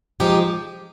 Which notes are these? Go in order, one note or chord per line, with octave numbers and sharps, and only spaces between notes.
C3 F3 G#3 D#4 G4